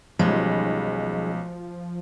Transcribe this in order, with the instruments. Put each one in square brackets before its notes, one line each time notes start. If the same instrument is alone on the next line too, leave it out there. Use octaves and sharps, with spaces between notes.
[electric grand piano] B1 [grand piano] D#3 G3 C#4 [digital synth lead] F3 [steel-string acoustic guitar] G#3